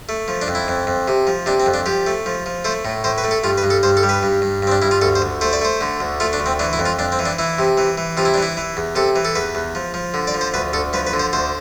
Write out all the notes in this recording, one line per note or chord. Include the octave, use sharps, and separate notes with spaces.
A3
F3
D4
F2
E4
F2
F2
C3
F3
C3 D4
C4
F2
D4
F3 G4
A3
F3
F3
A3 C5
A2
A2 C5
B4
A3
A4
G2 F4
B4
G2
A4
G2 C5
A4
G3
B4
G2
G2
G2 C4
D4
G2 E4
F4
D2 A4
C5
D2
A3 C5
D5
A3 C5
D3
D2
A3 F4
D4
D2
C4
E3 D4
E4
F2
F4
F2 D4
C4
E3
D4
E3 E4
C3
E3
E3
C3 F4
E4
D4
E3
E4
E3
E2
C3 A4
E3
A4
E2 B4
E2
F3
F3
D3
D5
F3
C5
D2 B4
D2 A4
F3 B4
B4
D3
C5
D2 C5